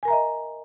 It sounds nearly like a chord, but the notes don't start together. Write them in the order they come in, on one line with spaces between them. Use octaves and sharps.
G#5 A#4 A#5 E5 D#5